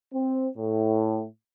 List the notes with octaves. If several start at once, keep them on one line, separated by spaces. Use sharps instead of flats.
C4
A2